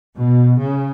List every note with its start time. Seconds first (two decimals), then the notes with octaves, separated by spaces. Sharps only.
0.16 B2
0.59 C#3